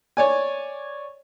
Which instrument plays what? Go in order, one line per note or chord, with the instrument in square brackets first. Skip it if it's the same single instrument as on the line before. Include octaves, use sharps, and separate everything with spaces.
[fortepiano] C#5 D5 G#5